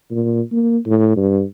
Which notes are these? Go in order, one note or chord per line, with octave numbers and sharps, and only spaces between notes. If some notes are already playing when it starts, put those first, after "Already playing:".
A#2
A#3
A2
G2